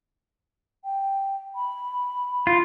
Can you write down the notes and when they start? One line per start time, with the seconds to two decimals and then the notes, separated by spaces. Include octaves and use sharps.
0.85 G5
1.55 B5
2.47 F4